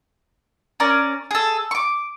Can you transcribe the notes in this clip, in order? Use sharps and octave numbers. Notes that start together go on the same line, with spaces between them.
C#4 A#4 D5
G#4 A4
C#6 D6